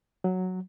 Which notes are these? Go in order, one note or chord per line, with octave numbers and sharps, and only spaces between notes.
F#3